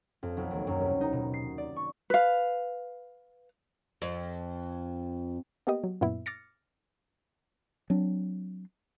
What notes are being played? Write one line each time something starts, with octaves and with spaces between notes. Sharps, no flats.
F2
B1
D#2
F#2
C2
D#4
B2
C7
D5
C#6
B4 F5
F2
A#3 B3 G4 D#5
F#3
F#2 A#2 B3 E4
D6 F6 A6 A#6 C#7
F#3 C4 D4